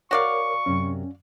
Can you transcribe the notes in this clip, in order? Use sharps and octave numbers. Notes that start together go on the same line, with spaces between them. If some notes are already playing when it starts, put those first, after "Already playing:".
F#4 A#4 C#5 D5 F5 C#6
F#2 C3 C#4